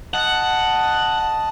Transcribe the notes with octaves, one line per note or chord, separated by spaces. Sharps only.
D#5 F#5 A5